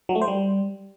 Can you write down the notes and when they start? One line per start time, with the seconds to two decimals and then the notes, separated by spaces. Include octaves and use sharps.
0.09 F#3
0.15 A3
0.21 C5
0.28 G3